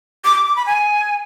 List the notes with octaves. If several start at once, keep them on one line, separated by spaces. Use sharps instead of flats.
D6
D6
D6
B5
G#5